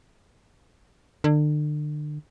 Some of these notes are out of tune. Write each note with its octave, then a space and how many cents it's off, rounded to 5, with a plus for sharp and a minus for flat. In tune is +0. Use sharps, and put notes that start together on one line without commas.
D3 +35